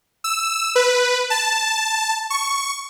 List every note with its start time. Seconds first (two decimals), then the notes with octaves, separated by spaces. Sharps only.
0.24 E6
0.75 B4
1.30 A5
2.30 C#6